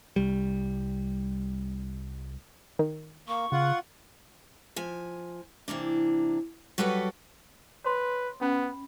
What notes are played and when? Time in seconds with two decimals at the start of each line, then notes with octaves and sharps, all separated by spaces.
0.16 C2 G3
2.79 D#3
3.28 A#3 C#6
3.52 C#3 F4 F#5
4.76 F3 G#5
5.68 C3 E3 A#3 D4
6.78 F#3 G3 F#4 A4 B4 F#5
7.85 B4 C#5 C6
8.41 B3 C#4 B5